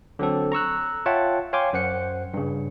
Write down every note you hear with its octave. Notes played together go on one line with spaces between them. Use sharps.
D3 F#3 C4 A4
A#5 C#6 E6 F#6
F4 C#5 E5 F#5 G5 A5
C#5 F5 G5 G#5 C6 D6
F#2 C5 F#5 C#7
G2 C#3